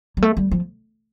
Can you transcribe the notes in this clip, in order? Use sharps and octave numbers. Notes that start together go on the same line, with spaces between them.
G3
A3
G3
F3